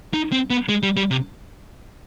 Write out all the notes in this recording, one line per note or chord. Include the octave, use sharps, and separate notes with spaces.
D#4
C4
B3
G#3
G3
G3
C3